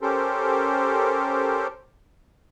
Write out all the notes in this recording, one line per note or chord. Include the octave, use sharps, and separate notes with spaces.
C#4 G4 A4 A#4 C5